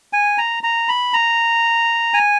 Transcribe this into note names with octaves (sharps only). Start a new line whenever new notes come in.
G#5
A#5
A#5
B5
A#5
G#5